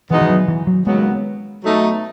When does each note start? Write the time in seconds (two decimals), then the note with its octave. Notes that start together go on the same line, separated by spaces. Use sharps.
0.10 E2 B2 E3 G#3 B3 D#4
0.21 E3
0.30 F#3
0.48 E3
0.67 F#3
0.86 D#2 C#3 F#3 G#3 B3
1.62 B2 F#3 A3 D#4